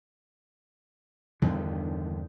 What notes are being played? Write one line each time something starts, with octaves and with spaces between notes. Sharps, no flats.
E2 G2 D3 D#3